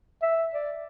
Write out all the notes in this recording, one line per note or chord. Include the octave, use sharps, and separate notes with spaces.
E5
D5